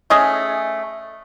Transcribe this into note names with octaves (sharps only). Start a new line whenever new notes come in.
A3 C#4 G#4 D#5